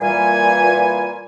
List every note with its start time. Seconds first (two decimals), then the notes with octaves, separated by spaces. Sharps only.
0.01 A#2 E3 G3 G#5